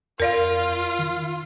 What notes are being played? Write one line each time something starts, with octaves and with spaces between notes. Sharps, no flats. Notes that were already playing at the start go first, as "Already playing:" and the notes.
F2 F4 A#4 D5 F5
D#3